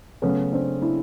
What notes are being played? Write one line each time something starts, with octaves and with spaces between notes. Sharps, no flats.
C#3 F#3 A3 B3 C#4
C4 D4
D4 E4